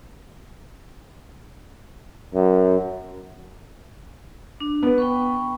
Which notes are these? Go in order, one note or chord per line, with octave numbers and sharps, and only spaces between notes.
F#2
D4
B3 B4
G5 B5 C#6